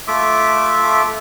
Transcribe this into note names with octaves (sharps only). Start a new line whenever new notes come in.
A3 F4 E5 D6